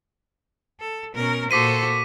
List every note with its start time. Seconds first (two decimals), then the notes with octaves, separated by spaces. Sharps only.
0.80 A4
1.15 B2 C#4 A#4
1.51 A#2 F#4 A4 C5 D6 B6 D#7